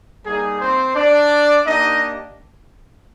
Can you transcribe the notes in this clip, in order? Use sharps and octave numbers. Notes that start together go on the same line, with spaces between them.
G3 A#3 D#4 G#4
C4 C5
D4 D5
A#3 D4 D#4 G4 D#5